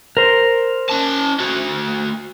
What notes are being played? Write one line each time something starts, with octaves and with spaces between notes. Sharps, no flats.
A#4 C5
C#4 A5
A3 F#4